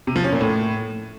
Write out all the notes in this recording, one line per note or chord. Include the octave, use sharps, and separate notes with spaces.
C3
F3
C#4
A#2
A2